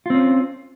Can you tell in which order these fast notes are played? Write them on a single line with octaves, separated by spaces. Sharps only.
F4 C4 C#4